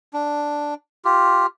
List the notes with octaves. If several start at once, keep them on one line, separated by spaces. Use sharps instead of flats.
D4
F4 G4